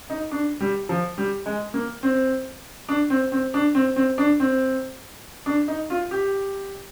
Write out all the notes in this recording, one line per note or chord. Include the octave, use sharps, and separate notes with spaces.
D#4
D4
G3
F3
G3
G#3
A#3
C4
D4
C4
C4
D4
C4
C4
D4
C4
D4
D#4
F4
G4